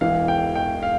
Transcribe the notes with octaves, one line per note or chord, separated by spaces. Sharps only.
E1 E2 E3 F5
G5
G5
F5